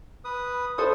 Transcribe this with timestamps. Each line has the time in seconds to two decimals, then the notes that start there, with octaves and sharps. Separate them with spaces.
0.25 B4 D#6
0.78 A4 C5 C#6 D#6